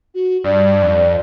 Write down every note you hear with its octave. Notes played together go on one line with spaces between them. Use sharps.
F#4
G2 D5
F2